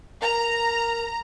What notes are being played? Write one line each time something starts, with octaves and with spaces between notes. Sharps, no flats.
A#4 A#5